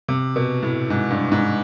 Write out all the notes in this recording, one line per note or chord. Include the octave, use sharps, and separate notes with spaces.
C3
B2
A2
G#2
G2
G#2